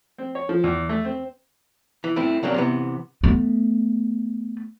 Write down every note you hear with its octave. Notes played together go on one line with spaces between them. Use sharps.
C4
C#5
F3
E2
A3
C4
E3
A3 C4 E4
C#3 F#3 A#3 C4 D4
C3 E3 B3
A3 B3